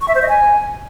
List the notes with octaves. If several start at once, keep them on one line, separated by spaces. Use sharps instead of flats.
C#6
E5
C5
D#5
G#5